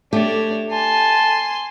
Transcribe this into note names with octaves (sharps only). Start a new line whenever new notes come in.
A3 D4 G4 C#5
G#5 A5 C6